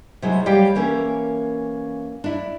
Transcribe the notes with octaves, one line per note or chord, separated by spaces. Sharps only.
C3 F#3 G#3 E4
G3 G4 C#5 F5 G5
E3 A#3 C#4 A4 A#4
D4 E4